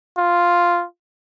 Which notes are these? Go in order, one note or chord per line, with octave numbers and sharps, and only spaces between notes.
F4